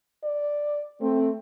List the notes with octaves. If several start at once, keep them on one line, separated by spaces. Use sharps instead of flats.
D5
A3 C4